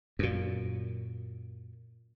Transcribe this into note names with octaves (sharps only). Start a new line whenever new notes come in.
F#2 A#2